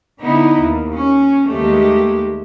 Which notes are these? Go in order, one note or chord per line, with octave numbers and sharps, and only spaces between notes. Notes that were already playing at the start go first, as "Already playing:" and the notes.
D3 B3 D#4 E4
D#2
C#4
D#2 G#3 A3 G4